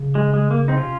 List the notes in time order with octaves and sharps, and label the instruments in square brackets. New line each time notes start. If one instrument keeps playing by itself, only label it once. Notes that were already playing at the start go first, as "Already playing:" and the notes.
Already playing: [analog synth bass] C#3
[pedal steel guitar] G#3
G#3
A#3
C4 D#4
[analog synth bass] C3 [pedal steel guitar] C#4 F4